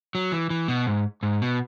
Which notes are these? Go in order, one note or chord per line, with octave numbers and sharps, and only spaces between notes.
F#3
E3
E3
B2
G#2
G#2
B2